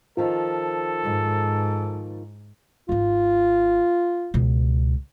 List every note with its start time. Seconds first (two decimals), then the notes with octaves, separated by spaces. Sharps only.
0.17 D#3 F3 C4 F4 A4
1.04 G#2
2.89 G#1 D#4 F4
4.34 C#2 B2